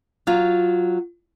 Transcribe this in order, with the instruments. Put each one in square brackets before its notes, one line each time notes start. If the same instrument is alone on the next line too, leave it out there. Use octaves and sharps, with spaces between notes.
[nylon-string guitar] F#3 F4